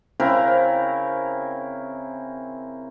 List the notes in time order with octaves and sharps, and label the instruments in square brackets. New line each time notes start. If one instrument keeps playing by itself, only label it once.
[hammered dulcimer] C#3 C4 E4 A#4